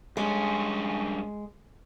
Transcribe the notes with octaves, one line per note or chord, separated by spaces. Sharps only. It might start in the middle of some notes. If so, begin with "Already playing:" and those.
G2 G#3 C#4